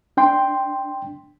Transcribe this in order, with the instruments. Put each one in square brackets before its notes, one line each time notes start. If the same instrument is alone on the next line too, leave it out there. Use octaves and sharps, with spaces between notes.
[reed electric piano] D4 G5 C6